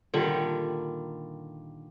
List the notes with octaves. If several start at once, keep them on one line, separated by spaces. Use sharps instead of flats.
A#2 D3 D#3 G3